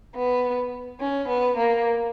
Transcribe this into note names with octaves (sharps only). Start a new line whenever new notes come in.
B3
C#4
B3
A#3